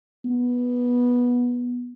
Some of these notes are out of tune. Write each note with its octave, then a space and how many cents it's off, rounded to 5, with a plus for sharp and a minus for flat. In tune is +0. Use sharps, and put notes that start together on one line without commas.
B3 -10